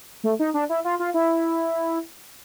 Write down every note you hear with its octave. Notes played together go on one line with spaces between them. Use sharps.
A3
D#4
D4
E4
F4
F4
E4